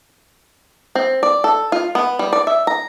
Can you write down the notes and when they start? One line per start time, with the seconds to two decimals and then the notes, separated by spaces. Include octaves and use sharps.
0.95 C4
1.23 D5
1.44 A4
1.72 F4
1.95 B3
2.19 G3
2.33 D5
2.47 E5
2.67 A#5